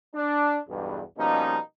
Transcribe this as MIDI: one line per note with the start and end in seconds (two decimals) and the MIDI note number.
0.15 0.58 62
0.69 1.02 35
0.69 1.02 40
0.69 1.02 43
1.18 1.57 47
1.18 1.57 53
1.18 1.57 55
1.18 1.57 58
1.18 1.57 61
1.18 1.57 63